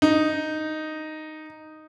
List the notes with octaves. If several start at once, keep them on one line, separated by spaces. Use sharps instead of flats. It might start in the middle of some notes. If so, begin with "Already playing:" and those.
D#4